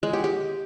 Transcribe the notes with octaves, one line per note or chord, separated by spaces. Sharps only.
G#3
G4
G4